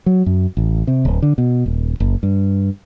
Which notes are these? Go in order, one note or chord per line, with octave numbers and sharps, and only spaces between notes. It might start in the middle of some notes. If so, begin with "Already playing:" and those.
F#3
F#2
A1
C3
D1
D3
B2
D#1
F#1
G2